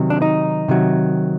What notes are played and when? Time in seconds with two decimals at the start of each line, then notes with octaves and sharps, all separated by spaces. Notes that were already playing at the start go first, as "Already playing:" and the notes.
Already playing: C3 D#3 F#3
0.10 D4
0.22 D#4
0.68 C3 D#3 F#3